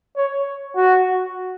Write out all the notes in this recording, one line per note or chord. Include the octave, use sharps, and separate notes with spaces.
C#5
F#4